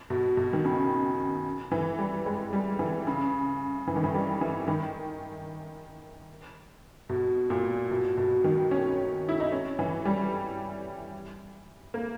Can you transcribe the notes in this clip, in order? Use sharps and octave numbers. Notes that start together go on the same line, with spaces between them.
B2
B2
D#3
C#3
E3
G3
G#3
G3
E3
C#3
E3
D#3
E3
G3
E3
D#3
B2
A#2
B2
B2
D#3
C#4
E4
D#4
C#4
E3
G3
A#3